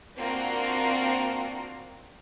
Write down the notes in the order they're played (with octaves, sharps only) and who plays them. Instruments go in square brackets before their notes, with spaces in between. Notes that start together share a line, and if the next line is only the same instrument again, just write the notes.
[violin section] A#3 C4 D4 F4 F#4 A#4